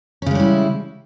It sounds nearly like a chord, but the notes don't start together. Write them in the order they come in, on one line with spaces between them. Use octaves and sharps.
C#4 C#3 G#3 G3 E4